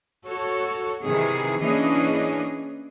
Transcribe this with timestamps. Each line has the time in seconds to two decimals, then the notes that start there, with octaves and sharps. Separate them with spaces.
0.26 F#4 A4 C#5
1.04 C3 D#3 E3 G#4
1.62 E3 A#3 C#4 D4 G#4 D#5